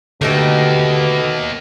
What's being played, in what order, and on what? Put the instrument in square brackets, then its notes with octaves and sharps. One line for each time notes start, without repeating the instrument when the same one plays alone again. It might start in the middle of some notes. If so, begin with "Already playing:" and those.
[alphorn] B2 [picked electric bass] D3 [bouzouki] A3 G4 A4 [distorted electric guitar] A#3 D#4